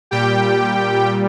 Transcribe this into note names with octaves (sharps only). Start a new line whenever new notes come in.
A#2 G3 G4 G5